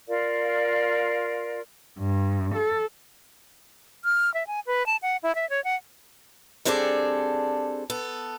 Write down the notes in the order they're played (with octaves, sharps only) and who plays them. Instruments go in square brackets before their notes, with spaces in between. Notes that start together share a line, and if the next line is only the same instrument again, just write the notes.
[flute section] F4 A#4 D5 F5
[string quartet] G2
A4
[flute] F6
E5
G#5
B4
A5
F#5
E4
E5
C#5
F#5
[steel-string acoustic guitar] G3 C4 D4 G#4 A4 D5
B3 A4